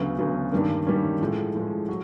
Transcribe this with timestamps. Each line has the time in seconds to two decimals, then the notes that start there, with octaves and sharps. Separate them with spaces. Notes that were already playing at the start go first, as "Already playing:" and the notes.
Already playing: D2 C#3 F#3 B3
0.18 D2 C#3 F#3 B3
0.52 G2 D#3 G3 A#3 C#4
0.87 G2 D#3 G3 A#3 C#4
1.21 A2 F3 G#3
1.55 A2 F3 G#3
1.88 F#3